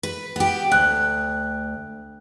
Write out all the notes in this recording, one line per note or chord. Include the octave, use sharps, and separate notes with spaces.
B4
B3 G4
D2 G5 F#6